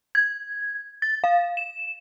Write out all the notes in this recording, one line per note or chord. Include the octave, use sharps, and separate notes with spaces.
G#6
A6
F5
E7